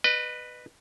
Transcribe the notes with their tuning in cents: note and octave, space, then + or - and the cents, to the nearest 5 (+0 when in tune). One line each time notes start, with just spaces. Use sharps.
B4 +0 D#5 -35